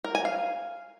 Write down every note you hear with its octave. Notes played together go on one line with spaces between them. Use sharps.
A#4
G#5
F5